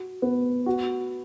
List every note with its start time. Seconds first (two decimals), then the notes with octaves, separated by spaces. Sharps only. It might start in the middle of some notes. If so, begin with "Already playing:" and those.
Already playing: F#4
0.22 B3
0.66 F#4